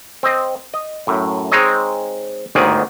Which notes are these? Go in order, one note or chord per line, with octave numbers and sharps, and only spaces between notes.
C4 D#5
D#5
F#2 A2
G#3 C4 D#4 G#4 C#5 D#5
G1 D2 G#2 D#3 G#4 D5